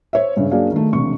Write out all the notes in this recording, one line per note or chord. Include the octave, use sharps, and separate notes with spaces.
C5 C#5 E5
G2 C#3
F#3 A#3 D4 G#4 D5 F5
D#3 A3
E1 C3 C#6